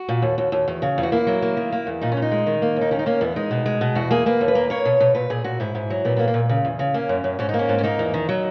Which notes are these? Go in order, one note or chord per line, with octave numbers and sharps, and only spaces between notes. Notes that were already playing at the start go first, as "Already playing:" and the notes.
Already playing: F#4
A#2
D#2
D#2
D#2
E2
C#3
E2
F#4
A#3 E4
F#3
A#3
D#3
A#3
E2
A#2 D#4
C#4
A#2
D#4
G#3
D#3
A#3
D#2
D#4
D#3 C#4
D#4
A#3 C#4
E2 B3
G#3 D#4
B2
G#3
B2
E2 F#4
A#3 G#4
A#3 B4
D#2
B4
A#3
A#3 C#5
B2
B2
A#2 B4
A#2 G#4
A#2 F#4
G#2 E4
G#2
F#3
A#2 B3
A#3 B3
A#3
A#2
C#3
E2
C#3
A#3 C#4
F#2
F#2
G#2 C#4
D#4
A#3
C#4
G#2
C#4
A#3 D#4
E2
D#3
F#3